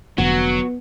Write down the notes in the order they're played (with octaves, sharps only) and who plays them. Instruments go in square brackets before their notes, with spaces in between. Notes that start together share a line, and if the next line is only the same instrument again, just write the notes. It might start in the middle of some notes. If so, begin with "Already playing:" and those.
[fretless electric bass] F1 D3 [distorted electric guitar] F#3 [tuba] B3 [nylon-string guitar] F#4